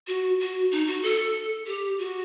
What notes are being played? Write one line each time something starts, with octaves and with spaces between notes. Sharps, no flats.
F#4
F#4
D#4
F#4
A4
G4
F#4